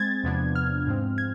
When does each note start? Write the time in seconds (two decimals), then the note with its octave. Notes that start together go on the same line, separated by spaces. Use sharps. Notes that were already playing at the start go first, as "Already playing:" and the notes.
Already playing: G#3 C4 G#6 A6
0.24 E2 C3 F3 B3 D4
0.55 F6
0.87 G#2 F3 G#3 C4
1.18 G#6